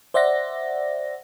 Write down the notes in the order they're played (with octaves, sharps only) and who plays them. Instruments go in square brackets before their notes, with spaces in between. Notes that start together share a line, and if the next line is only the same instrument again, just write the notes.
[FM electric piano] C5 D5 E5 F#5 A#6